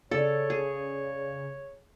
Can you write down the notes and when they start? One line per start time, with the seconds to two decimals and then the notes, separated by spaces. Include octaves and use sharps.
0.11 C#3 A4 C#5 D5
0.50 G#4